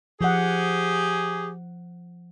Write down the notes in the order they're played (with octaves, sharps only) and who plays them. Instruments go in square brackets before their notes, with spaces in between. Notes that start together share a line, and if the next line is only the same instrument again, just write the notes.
[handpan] F3 F#5 [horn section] G4 G#4